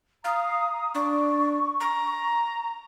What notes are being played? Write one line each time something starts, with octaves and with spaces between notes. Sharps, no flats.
F5 A#5 D#6
D4 C#6
A#5